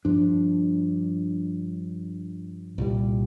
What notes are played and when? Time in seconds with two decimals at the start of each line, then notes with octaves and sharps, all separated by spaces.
0.05 G2 F3 D4
2.78 C2 A#2 G3